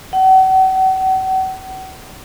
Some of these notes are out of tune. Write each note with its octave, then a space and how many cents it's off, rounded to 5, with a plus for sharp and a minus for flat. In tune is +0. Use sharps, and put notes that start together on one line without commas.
F#5 +40